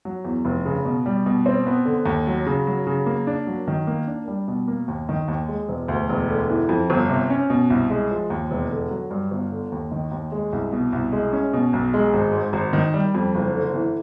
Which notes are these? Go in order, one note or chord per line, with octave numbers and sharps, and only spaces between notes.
F#3
E2
F1
C#3
B2
G3
B2
C4
B3
D3
D#2
F#3
C#3
F#3
C#3
A#3
D4
F#3
D#3
A#3
D4
G3
B2
A#3
D#2
D#3
D#2
G#3
E1
D2
E1
D3
E3
F2
G1
C3
C#4
B2
C2
G#3
F3
D#2
E1
D3
F#3
G2
G1
D3
D#2
D#3
D#2
G#3
C2
B2
C2
G#3
C#4
B2
B1
G#3
G#1
G#2
G#1
D#3
G3
F2
F#1
D3
E3